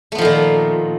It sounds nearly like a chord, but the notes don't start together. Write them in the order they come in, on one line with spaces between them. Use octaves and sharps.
A3 B3 F3 D#3 A#2